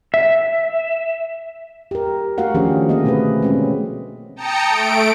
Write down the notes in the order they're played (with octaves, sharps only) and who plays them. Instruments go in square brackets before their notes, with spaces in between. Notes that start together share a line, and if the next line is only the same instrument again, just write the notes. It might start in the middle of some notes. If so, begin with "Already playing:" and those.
[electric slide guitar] E5
[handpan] G4 A#4
A3 F#4 A#4 F5 F#5
D#3 F3 C#4 D4 G4 G#4
D3 A3 A#3 G#4 D#5
B2 A3 C4 G#4 B4
G#3 C4 C#4
[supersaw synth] G5 A5 A#5 D#6 C#7
A3 D7